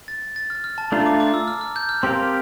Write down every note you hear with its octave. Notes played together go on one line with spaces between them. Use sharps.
A6
A6
F6
F6
A5
A3 D4 F4 A#5
D6
D6
E6
F6
F6
G6
F6
C4 G4 A#4 F5 C6